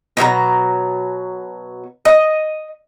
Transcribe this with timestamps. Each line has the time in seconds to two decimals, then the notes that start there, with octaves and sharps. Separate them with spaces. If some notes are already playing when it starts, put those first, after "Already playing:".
0.17 B2 F#3 A#4 A#5
2.05 D#5